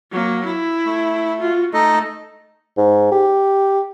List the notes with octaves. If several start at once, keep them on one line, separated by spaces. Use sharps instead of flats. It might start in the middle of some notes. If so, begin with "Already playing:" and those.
F#3 A#3
E4
A3
F4 F#4
A3 D#4 A4 D#5
G#2
G4